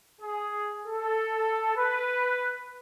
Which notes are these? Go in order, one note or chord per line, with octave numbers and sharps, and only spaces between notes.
G#4
A4
B4